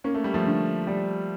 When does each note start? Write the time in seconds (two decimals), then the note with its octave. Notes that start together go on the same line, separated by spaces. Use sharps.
0.04 A#3 C#4
0.14 A3
0.24 G3
0.34 F3 A3
0.46 D3
0.87 G3